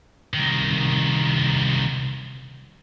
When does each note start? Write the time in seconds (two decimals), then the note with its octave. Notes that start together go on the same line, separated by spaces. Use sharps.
0.34 C2 D#3